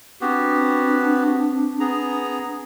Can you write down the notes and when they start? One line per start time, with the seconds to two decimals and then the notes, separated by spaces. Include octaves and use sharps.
0.21 B3 C4 D4 F#4 G4
1.80 B3 G#4 A#5